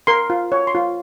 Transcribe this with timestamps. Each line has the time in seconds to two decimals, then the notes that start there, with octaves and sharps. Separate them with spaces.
0.07 A#4 C6
0.30 F4
0.52 C#5
0.67 C6
0.75 F4